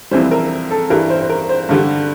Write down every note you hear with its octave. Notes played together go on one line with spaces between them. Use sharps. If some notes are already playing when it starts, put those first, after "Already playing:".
F2 C3 E3 G3 C5
A#4
A4
G2 E3 G3 A#4
C5
C5
A#4
C5
G2 D3 G3